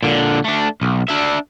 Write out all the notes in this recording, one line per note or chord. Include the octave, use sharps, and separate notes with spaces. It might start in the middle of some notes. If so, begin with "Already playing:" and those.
A#2 D3
A3 D4
B1
D4 E5